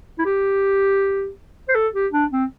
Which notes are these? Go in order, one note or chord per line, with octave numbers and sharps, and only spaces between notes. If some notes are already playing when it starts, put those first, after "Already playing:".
E4
G4
C5
A4
G4
D4
C4